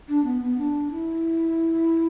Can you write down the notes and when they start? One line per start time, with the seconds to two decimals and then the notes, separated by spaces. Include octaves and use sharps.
0.09 D4
0.24 B3
0.42 B3
0.58 D4
0.92 E4